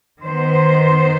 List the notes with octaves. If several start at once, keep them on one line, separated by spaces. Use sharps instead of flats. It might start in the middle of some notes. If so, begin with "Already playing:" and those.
D#3 B3 C5